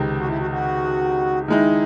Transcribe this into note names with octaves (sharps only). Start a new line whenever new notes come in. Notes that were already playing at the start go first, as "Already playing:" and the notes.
Already playing: C#2 C3 D#3
F#4
E4
F#4
F#4
D#3 G#3 D#4 E4